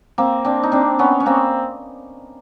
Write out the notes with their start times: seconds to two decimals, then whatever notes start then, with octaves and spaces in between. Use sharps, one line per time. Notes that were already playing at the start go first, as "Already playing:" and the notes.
0.18 A#3 C4
0.45 C4 D4
0.63 D#4
0.72 C4 D4
0.99 B3 C#4
1.20 C#4
1.26 A#3 C4